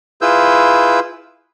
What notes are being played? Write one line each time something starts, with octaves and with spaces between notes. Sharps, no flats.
E4 F4 G#4 B4 E6 G6